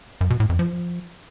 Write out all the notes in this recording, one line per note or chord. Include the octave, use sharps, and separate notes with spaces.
F#2
B2
A2
F2
F3